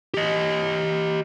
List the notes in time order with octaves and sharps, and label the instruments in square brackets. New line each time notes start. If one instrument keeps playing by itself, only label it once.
[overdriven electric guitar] G4 D#5